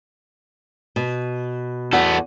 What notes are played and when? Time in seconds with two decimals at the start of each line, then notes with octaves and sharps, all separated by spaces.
0.96 B2
1.93 E2 B3 F#4 A4 F#5